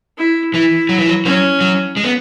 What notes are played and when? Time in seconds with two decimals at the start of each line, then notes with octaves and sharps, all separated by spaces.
0.18 E4
0.53 E3 E4
0.89 F#3
0.98 E3
1.07 F#3
1.25 F#3 C#4
1.61 F#3
1.97 G#3
2.04 B3